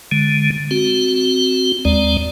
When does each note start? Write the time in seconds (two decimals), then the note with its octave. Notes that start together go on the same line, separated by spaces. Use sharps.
0.12 D3 G#3
0.71 C4 F#4
1.85 D#2 G#3 C4 D5